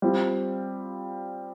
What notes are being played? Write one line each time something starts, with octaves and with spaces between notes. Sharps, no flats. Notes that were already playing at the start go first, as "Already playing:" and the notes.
G3 C4 F4